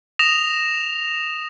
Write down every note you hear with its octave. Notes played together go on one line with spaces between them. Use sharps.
D#6 A#6 E7 F7